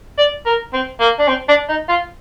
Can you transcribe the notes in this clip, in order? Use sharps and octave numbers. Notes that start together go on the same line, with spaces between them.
D5
A#4
C4
A#3
D4
C4
D4
D#4
F4